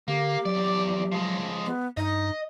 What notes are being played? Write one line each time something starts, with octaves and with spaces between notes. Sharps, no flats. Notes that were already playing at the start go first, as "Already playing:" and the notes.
D3 A#3 G4
E2 F#3 D5
F3 G#3
B3
G2 D#4 D#5